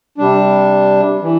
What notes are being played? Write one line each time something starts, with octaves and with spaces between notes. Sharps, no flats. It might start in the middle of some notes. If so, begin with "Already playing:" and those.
C3 G3 D4
E3